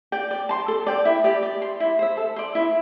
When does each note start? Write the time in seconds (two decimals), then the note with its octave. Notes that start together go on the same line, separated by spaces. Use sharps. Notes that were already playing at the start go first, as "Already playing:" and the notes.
0.12 D5 G5
0.31 D5
0.49 A5 C6
0.68 A4
0.87 D5 G5
1.05 E4
1.24 G4 D5 G5
1.43 D5
1.62 C6
1.80 E4
1.99 C5 E5
2.17 A4
2.36 D5 C6
2.55 E4